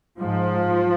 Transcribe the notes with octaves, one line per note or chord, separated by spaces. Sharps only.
G#2 F3